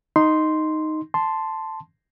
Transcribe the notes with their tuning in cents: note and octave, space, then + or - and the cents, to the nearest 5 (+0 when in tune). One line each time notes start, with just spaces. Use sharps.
D#4 +0 C6 -5
A5 +0 C6 -5